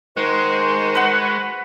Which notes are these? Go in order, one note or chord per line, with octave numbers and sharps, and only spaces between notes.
D#3 G#3 D#4 F#4 C5
B4 F#5